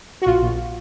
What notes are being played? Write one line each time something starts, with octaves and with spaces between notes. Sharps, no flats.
F#4
A#1 F4
A#1